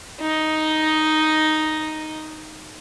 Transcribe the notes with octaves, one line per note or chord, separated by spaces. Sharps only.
D#4 D#5